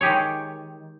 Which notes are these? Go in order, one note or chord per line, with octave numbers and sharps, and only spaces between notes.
D#3 G#3 G4 G#4 C#5